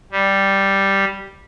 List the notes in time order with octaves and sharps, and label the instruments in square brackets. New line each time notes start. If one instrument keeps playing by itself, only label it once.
[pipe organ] G3